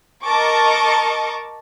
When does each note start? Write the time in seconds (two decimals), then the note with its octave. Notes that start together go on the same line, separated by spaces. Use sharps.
0.24 A#4 D#5 A5 C#6 D6